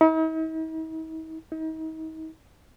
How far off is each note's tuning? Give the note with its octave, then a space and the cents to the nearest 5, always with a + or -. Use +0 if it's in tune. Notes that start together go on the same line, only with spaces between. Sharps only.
D#4 +45
D#4 +35